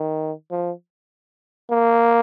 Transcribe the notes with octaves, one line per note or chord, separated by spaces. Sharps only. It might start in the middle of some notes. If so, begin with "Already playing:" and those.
Already playing: D#3
F3
A#3